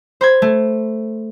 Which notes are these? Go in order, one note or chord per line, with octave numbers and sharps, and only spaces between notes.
C5 B5 G#6
A3